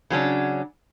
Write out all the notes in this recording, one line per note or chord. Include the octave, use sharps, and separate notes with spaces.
C#3 F#3 C#4 D4